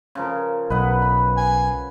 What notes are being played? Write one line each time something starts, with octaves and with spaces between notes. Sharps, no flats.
C#3 F3 A#4
B1 B4 D#5 F#5
B5
G#5